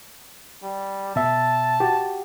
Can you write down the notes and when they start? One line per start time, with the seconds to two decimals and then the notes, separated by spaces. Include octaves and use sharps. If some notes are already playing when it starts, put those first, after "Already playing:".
0.63 G3
1.16 B2 E5 A5
1.80 F#4 G4